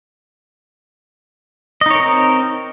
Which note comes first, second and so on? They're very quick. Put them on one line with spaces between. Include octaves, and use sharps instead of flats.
D#5 D#4 C#5 A#4 C4